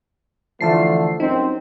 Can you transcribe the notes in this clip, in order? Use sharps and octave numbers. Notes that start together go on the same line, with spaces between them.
D3 E3 F3 A3 A5 C7
C2 F#2 C4 D#4